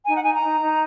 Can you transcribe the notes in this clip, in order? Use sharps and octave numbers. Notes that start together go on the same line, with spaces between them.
D#4 G#5
F#5
D#4 G#5
A#5
D#4
D#4